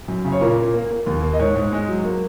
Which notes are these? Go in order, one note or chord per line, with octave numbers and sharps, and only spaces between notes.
F#2
C#3
C#5
A#2 A#4
A#3
A#3
A#3
D#2
A#3
D#5
G#2 C#5
G#2
G#3
F#3
A#3